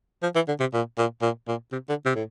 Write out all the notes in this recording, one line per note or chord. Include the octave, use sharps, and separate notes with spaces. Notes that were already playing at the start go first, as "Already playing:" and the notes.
F3
E3
D3
C3
A#2
A#2
A#2
A#2
C3
D3
C3
A2